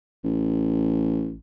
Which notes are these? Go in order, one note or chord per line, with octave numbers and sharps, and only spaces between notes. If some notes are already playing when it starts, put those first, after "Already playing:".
A1